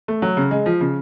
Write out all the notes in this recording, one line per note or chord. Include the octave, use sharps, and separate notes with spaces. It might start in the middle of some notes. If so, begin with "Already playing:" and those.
A3
F#3
C#3
G#3
F3
C#3